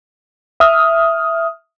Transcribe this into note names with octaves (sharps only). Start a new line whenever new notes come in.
E5 D#6 F6